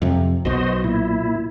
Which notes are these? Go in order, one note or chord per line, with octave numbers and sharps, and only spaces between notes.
F2 C3
B1 B2 F#4 C5 D#5
A#2 E4